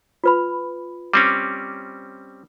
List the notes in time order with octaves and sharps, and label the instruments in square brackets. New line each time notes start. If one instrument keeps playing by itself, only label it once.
[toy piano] F4 B4 B5
[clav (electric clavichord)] G3 C4 C#4 [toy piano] D6